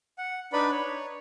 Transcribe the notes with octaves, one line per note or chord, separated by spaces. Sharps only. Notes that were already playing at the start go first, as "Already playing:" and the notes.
F#5
D4 D#4 B4 D5 B5
C#5